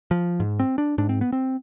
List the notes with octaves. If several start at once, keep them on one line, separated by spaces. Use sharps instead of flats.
F3
G#2
C4
D4
G#2 D4
C4
B3
C4